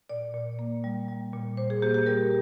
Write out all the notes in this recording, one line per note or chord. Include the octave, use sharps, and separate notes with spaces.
A#2 D5
A#2
A#3
G3
G3
A#2
A#2 C5
G#4
A#3 G4
G4
G3 A#4